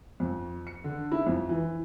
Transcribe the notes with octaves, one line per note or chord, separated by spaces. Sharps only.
F2
C#7
D3
E4
F2
E3